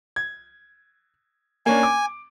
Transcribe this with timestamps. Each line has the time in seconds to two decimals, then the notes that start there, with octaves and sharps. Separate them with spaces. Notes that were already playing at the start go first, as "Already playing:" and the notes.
0.16 G#6
1.66 A#3 C#4 D4 G#5
1.83 D6